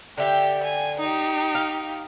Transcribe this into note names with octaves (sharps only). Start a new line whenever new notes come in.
D3 G4 E5 G5
G#5
D#4 G4
F5